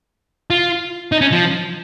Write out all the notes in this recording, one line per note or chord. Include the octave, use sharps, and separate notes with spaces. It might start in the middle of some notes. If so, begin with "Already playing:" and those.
F4
D#4
C#4
F3